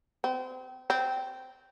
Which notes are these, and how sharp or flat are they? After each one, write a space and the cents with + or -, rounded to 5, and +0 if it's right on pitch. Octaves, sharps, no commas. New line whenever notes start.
C4 -30
C4 -15